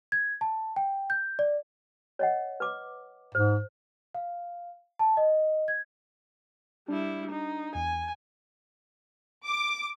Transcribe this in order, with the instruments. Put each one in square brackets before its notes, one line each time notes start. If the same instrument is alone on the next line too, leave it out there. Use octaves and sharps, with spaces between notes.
[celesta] G#6
A5
G5
G6
D5
[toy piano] C#5 D#5 F#5
B4 D6
[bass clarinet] G#2 [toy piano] C5
[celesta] F5
A5
D#5
G#6
[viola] G3 E4 [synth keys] D4
[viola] D#4
[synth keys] E2 [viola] G#5
[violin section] D6